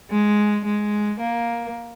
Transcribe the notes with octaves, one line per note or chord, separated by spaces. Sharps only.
G#3
G#3
A#3